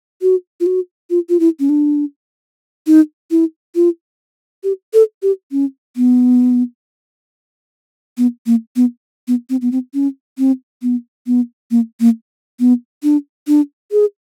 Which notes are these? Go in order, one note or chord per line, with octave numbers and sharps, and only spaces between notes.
F#4
F4
F#4
F4
F4
E4
C#4
D4
D#4
E4
F4
G4
A4
G4
C#4
B3
B3
A#3
B3
B3
C4
B3
C4
C#4
C4
B3
B3
A#3
A#3
B3
D4
D4
G#4